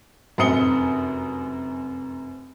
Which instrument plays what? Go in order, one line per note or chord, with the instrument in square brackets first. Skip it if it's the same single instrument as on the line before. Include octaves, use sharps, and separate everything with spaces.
[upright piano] F1 F#2 C4 D#6 C#7 G7